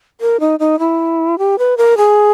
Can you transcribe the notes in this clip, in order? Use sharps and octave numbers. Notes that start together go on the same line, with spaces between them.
A#4
D#4
D#4
E4
G4
B4
A#4
G#4